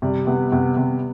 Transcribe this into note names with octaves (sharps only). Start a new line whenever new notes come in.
C3 G3
C3 B3
C3 B3
C3